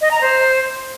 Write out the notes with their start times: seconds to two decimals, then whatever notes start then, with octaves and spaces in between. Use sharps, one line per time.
0.01 D#5
0.11 A#5
0.21 C5